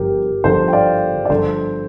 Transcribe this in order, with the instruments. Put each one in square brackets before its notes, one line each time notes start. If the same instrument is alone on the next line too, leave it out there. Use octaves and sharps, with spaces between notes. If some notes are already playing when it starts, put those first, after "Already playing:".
Already playing: [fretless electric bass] G1 D3 F3 [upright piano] G4 A#4
[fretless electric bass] G1 G2 D3 F3 [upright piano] A4 C5
[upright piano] G5
D5 F5
D5
[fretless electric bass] G1 G2 D3 F3 [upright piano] A4 C5